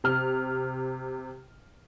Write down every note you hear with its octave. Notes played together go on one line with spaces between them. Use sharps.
C3 F6